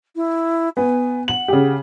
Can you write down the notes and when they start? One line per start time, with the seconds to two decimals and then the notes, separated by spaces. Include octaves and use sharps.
0.16 E4
0.77 B3 G#5
1.28 F#5 F#7
1.48 C#3 G4